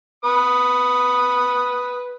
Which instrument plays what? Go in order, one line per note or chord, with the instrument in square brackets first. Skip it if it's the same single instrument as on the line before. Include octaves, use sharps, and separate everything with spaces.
[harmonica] B4 D#6